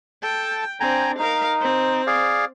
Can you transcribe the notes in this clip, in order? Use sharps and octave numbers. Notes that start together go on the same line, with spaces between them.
A4 G5 A5
C4 D4 G5 G#5 A#5
D#4 A#4 F5
C4
G#4 D5 F5